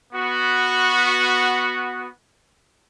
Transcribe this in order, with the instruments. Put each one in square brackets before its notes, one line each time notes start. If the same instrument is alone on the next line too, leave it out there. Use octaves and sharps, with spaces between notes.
[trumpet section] B3 F#4